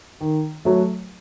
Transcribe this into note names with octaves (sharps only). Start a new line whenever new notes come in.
D#3
F#3 A3